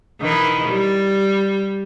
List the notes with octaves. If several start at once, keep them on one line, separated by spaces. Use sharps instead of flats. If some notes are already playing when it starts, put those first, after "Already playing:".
D#3 E3 E4
G3